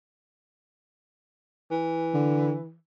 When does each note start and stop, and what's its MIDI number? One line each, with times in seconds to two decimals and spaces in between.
1.71 2.75 52
2.14 2.56 50